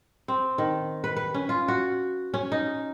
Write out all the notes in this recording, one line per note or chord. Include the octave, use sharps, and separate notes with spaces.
C4
D#3
B4
B4
C#4
F4
F#4
C#4
D#4